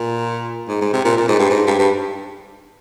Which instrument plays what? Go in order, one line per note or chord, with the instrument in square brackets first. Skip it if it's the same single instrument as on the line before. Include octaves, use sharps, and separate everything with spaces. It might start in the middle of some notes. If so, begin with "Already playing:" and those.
Already playing: [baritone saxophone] A#2
G#2
G#2
C3
A#2
A#2
G#2
G2
G#2
G2
G2